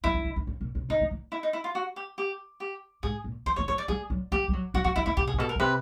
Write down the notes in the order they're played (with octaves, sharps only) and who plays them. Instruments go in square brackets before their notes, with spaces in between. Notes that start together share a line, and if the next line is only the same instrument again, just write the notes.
[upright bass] F3 [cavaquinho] E4
[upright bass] D3
D3
D#3
C#3
A#2
C3
[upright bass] C#3 [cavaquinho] D#4
[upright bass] D3
E3
[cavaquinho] E4
D#4
E4
F4
F#4
G4
G4
G4
[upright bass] G#2 [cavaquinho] G#4
[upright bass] A#2
[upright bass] E3 [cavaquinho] C5
[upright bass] E3 [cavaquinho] C#5
[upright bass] F3 [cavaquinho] C#5
[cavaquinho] D5
[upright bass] G3 [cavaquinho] G#4
[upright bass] F#3
[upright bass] F3 [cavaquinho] G4
[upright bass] G3
F#3
[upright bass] F#3 [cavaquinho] F#4
[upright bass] F3 [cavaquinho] F#4
[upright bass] E3 [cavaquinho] E4
[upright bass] D#3 [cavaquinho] E4
[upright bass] C3 [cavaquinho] G4
[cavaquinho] G#4
[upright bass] A#2
[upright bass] B2 [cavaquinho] A4
[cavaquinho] A#4
[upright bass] B2
[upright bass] C3 [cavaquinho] B4